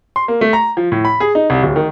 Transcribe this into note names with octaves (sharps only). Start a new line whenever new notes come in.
C6
A#3
A3
A#5
F3
A2
B5
G#4
D#4
C2
D1
D#3